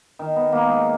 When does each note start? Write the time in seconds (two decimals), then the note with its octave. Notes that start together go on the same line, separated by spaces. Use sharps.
0.19 D#3
0.36 B3
0.53 A#3
0.67 G#3